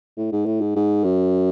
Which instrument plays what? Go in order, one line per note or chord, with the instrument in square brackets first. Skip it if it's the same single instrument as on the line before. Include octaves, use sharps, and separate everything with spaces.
[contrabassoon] A2
G#2
A2
G#2
G#2
F#2